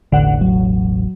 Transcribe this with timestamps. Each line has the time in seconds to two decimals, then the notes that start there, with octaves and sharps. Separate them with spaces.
0.12 E1 A1 D3 F#5
0.41 F#3